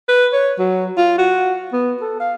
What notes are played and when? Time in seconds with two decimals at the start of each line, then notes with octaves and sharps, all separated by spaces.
0.08 B4
0.33 C#5
0.59 F#3
0.97 F4
1.18 F#4
1.73 B3
2.01 A4
2.20 F5